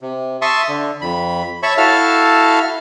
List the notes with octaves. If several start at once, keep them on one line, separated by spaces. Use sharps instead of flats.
C3
E5 A5 C6 C#6 D#6
D3
F2 B5
C#5 E5 A5 B5 C#6
E4 F#4 A4 F5 A5 F6